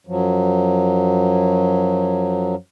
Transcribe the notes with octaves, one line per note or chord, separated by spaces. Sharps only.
F#2 F3 F#3